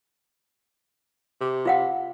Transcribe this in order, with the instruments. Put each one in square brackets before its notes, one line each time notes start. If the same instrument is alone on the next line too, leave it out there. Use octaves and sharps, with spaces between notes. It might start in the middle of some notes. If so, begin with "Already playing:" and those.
[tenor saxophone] C3
[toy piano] F4 F5 F#5